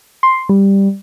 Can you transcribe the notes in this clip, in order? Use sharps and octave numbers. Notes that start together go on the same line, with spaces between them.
C6
G3